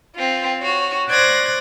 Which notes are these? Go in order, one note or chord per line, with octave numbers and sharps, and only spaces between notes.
C4 F4
F#4 C#5
C5 D5 F#6 G#6 A#6